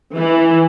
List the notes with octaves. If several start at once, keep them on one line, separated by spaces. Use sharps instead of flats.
E3